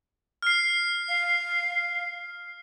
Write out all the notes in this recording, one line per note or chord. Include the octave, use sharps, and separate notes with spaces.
F6 C7
F5